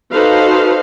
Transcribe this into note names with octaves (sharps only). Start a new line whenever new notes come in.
D#4 F#4 A4 B4 C5 F5